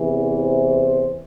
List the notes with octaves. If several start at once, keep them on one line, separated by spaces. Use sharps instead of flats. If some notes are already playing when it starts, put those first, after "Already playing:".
Already playing: E2 C3 E3
C5